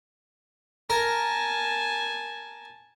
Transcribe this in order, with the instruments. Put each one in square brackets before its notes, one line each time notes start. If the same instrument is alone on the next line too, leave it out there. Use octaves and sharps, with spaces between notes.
[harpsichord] A#4 [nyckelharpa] G#5 A5